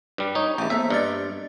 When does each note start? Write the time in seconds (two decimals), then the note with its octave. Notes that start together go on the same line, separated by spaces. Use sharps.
0.18 G2 G3
0.35 D#4 C#5
0.58 A1 E2 E5 G6
0.70 A#3 B3 C5 E5
0.90 G2 D5 D#5 A6